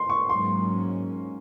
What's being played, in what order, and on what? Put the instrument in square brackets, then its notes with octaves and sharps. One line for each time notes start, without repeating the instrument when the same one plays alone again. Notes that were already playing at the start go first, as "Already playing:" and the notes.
Already playing: [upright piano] C6
C#6
[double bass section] G#2 F#3 A#3 C#4 [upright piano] C6